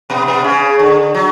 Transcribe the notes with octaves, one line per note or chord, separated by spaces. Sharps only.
B2 B3
B2 B3
C#3 C#4
D3
F#3